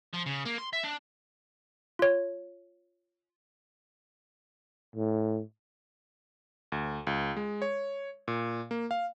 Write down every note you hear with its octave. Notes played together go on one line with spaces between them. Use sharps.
F3
C#3
A#3
C6
E5
D4
F4 C#5
A2
D2
C#2
G#3
C#5
A#2
A#3
F5